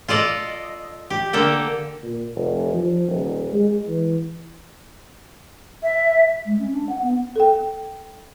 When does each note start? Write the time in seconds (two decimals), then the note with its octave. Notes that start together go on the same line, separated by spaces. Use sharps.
0.08 F4 A4 D5 D#5
1.10 G4
1.33 D3 A#3 A4 G5
2.03 A#2
2.35 F1
2.74 F3
3.08 D#1
3.52 G#3
3.87 E3
5.83 E5
6.45 G#3
6.59 C#4
6.72 D4
6.89 F#5
7.02 B3
7.36 A4 G5